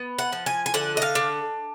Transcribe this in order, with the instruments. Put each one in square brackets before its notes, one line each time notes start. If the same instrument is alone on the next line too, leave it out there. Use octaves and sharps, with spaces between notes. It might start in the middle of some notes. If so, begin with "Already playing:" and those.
Already playing: [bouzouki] B3
F#5
F3
G#5
G#5
D3 F#5
D#5
F5
D4